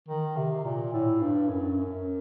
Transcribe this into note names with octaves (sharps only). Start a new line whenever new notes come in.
D#3
C3
A#2
A2
G2
F#2
F#2